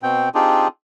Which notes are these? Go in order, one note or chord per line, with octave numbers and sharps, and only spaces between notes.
B2 C4 G5
C4 D4 D#4 F4 G4 G#4